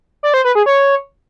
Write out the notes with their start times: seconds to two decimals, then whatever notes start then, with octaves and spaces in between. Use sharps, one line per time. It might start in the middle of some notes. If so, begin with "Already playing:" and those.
0.23 D5
0.34 C5
0.45 B4
0.55 G#4
0.66 C#5